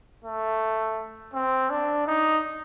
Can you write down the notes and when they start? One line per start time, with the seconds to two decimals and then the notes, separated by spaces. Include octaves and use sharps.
0.25 A3
1.34 C4
1.70 D4
2.07 D#4